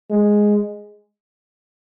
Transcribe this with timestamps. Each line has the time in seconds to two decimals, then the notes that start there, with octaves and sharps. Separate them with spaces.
0.11 G#3